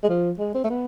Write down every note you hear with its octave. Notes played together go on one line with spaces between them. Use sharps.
G#3
F3
G#3
C4
A3
B3